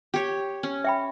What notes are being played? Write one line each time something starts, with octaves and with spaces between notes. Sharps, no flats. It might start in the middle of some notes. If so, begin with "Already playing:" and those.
G4 C#5
C#4
E5 G5 B5